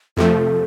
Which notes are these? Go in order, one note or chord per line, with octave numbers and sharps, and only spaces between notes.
F2 C3 F3 A3 A4